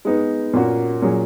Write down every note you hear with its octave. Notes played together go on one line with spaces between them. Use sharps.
G#3 B3 D#4
A#2 A#3 C#4 F#4
A#2 F#3 C#4 G#4